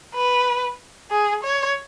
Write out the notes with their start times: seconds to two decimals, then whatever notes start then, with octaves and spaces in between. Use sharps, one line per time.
0.15 B4
1.10 G#4
1.43 C#5